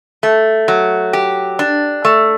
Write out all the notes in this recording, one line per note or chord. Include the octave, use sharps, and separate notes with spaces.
A3
F#3
G4
D4
A3